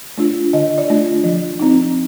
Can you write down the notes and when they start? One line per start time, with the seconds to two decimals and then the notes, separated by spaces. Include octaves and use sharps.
0.18 A3 D4 F4
0.53 D3 D#5
0.78 D5
0.88 A3 D4 F4
1.24 F3
1.60 C4 D#4